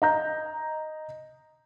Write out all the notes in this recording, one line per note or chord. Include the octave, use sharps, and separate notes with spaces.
D#5 A#5 G6